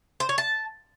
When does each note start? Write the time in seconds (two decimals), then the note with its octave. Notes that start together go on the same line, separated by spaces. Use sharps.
0.20 C5
0.29 C#5
0.38 A5